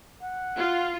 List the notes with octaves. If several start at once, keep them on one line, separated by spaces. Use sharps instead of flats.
F#5
F4